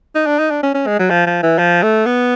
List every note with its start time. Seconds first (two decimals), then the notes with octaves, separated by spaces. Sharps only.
0.15 D#4
0.26 D4
0.39 D#4
0.50 D4
0.63 C#4
0.74 C#4
0.87 G#3
0.99 F#3
1.10 F3
1.27 F3
1.43 E3
1.58 F3
1.83 A3
2.06 B3